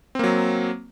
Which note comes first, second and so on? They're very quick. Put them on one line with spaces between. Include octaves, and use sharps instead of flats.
C4 A#3 F#3